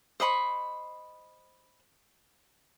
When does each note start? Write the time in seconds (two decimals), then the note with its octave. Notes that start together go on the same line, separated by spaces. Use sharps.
0.20 C5 D#5 B5 C#6